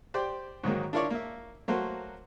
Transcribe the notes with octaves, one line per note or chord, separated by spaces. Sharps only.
G4 C5 D5 G5
G#2 D#3 F#3 A#3
D4 E4 F4 A#4 C#5 D5
A#3 E5
F#3 A3 A#3 F#4 C5